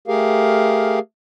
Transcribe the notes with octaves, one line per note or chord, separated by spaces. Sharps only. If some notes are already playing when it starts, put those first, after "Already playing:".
A3 G4 G#4 A#4 F5